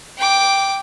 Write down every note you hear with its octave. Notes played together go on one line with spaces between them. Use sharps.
G5 D6